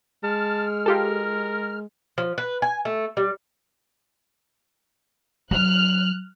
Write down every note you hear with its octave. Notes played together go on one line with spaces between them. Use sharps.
G#3 A5 F6
F4 G4 A4 A#4
F3
B4
G#5
A3
G3
F#3 F6 F#6